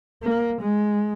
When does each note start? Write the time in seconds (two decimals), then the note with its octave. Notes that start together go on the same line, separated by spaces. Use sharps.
0.23 A#3
0.62 G#3